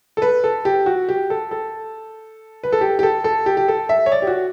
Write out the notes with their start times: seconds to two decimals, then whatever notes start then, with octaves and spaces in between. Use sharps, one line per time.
0.17 A4
0.22 B4
0.44 A4
0.65 G4
0.86 F#4
1.09 G4
1.30 A4
1.51 A4
2.64 B4
2.72 A4
2.81 G4
2.99 G4
3.03 A4
3.24 A4
3.46 G4
3.57 G4
3.68 A4
3.89 E5
4.06 C#5
4.12 D5
4.22 G4
4.27 F#4